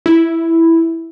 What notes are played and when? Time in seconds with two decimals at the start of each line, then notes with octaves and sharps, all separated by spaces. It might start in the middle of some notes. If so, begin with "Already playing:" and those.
0.06 E4